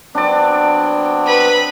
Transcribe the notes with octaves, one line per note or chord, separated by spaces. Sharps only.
F#3 B3 C4 D4 D5
B4 B5